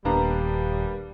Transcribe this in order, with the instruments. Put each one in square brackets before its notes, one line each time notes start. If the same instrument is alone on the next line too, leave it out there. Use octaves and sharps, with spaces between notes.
[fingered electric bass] D#1 [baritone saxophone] G3 [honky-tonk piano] A#3 B3 D4 [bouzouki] A#5